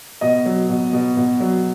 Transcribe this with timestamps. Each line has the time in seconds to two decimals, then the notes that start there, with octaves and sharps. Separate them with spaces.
0.21 B2 D#5
0.46 F#3
0.69 B2
0.93 B2
1.17 B2
1.40 F#3